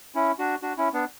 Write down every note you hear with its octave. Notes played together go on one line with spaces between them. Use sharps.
C#4 E4
D4 F#4
D4 F#4
C#4 E4
B3 D4